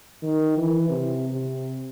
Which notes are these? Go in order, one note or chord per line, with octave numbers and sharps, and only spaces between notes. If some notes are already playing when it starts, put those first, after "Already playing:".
D#3
E3
C3
C3